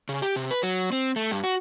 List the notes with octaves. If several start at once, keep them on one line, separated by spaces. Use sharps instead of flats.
C#3
G4
C3
B4
F#3
C4
A3
G2
F#4